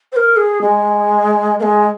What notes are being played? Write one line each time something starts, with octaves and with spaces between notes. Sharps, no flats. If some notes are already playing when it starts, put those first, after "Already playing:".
C5
A#4
G#4
G#3
A#3
G#3